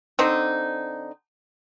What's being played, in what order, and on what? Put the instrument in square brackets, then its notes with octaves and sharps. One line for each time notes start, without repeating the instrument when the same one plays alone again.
[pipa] D3 C4 D#4